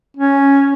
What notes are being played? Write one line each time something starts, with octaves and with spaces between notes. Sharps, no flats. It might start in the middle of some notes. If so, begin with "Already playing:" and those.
C#4